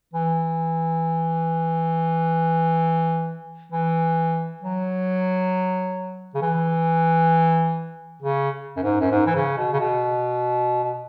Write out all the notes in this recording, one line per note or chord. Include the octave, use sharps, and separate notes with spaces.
E3
E3
F#3
C#3
E3
C#3
F#2
G#2
F#2
G#2
E3
C#3
B2
C#3
B2
B2